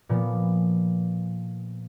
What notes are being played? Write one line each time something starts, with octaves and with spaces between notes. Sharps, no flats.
A#2 F3 B3